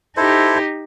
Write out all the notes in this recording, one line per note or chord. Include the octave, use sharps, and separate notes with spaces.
D#4 E4 G4 A4 C5